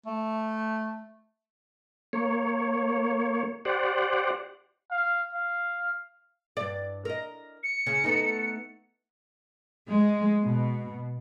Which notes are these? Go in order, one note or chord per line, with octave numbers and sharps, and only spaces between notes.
A3
A#3 C#5
G4 C5 D5 F#5
F5
F5
G2 D5
A#4 D#5
C#7
C#3 C#4
A3 B3 D#4
G#3
B2